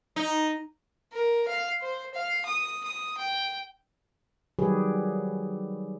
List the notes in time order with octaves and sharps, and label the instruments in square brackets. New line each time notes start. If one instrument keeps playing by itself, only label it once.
[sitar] D#4
[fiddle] A#4
F5
C5
F5
D#6
D#6
G5
[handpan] D#3 F#3 G3 G4 G#4 B4